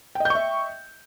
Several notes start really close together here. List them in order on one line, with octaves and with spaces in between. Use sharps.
G5 D#5 G6 C#6 E5